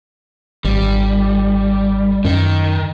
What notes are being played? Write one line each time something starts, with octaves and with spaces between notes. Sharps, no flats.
G#1 G3
F#2 D#3